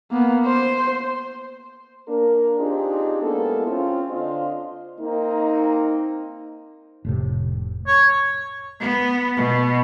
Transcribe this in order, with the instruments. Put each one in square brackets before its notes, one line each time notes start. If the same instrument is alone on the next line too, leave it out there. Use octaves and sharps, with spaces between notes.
[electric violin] A#3 B3
C5
[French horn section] A#3 D4 A#4
C4 D4 D#4 F4 G4 G#4
G#3 A#3 B3 E4 G#4 A4
C4 C#4 F4
D3 D4 F4 C5 D#5
[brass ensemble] A#3 C4 D#4
[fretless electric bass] F1 A2 C3
[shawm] C#5
[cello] B3
B2